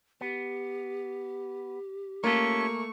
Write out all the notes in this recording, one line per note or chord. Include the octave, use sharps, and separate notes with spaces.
B3 G4
A3 A#3 C#4 F4 A4 C#6